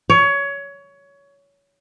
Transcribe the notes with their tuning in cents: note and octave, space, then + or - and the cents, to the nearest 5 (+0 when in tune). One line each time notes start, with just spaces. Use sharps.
C#5 +20